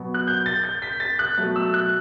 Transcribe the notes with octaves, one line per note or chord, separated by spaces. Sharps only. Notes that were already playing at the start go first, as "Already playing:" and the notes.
Already playing: B2 F#3 B3
F#6
G6
A6
G6
B6
A6
F#6
B2 F#3 A3
E6
F#6